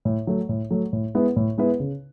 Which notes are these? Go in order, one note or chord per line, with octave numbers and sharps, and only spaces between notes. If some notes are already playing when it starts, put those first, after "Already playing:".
A2
F#3 A3
A2
F#3 A3
A2
G#3 B3 E4 B4
A2
G#3 B3 E4 B4
C#3